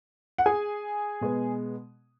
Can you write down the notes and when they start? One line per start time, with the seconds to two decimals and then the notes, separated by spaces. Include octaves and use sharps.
0.38 F#5
0.46 G#4 G#5
1.21 B2 G#3 B3